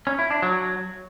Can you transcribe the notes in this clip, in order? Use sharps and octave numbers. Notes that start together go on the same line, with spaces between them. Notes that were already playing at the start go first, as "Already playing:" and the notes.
C#4
E4
D4
F#3